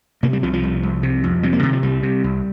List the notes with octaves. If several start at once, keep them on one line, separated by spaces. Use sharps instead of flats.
C3 A#3
G3
C2 F3
F3
C2
C2
C3
F2
C3 G3
A#3
C3 D#3
F3
C2 G3
C3
C2